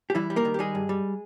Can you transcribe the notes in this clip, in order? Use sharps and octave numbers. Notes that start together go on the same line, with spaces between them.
G4
E3 G3 E4
G3
A#3 A#4
D#3
G4
G3 G#3 G#4
G2
G3